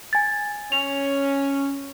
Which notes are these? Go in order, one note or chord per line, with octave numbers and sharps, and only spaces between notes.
G#5 G#6 A6
C#4 F7